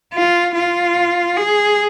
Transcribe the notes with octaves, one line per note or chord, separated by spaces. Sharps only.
F4
F4
G#4